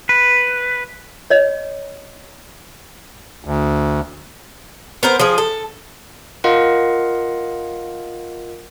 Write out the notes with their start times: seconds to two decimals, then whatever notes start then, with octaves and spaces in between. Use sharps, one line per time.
0.09 B4
1.30 C#5 D#5
3.45 D2
5.03 B3 A#4 C5
5.20 F3 G#4
5.38 A4
6.44 F4 A#4 D#5 F5 F#5